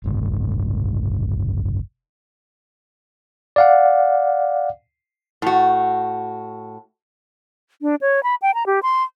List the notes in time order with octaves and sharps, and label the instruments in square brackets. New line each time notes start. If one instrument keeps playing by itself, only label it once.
[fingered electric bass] F#1 C2 G#2
[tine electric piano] D5 F5 F#5
[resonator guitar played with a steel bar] A2 F#4
[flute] D4
C#5
B5
G5
A#5
G4
C6